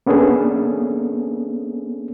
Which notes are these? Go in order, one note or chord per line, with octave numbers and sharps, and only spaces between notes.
A#3 B3 C#4 D4 G#4 A4